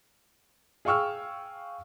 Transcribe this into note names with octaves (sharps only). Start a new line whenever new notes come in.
G#4 F5 G5 C#6 E6 F6